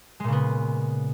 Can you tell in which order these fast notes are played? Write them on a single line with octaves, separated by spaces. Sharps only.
G#3 A#2 C#3 B3